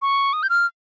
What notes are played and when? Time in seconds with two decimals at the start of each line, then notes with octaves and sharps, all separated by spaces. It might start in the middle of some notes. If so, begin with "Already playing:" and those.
0.02 C#6
0.33 D#6
0.43 G6
0.50 F6